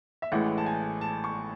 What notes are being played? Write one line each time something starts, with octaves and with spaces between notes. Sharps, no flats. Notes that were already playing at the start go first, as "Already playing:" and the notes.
E5
A1 A2 E3 G#3 F#5
A5
G#5
A5
C#6